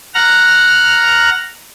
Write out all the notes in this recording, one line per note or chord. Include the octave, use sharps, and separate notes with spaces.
F#5 A#5 F6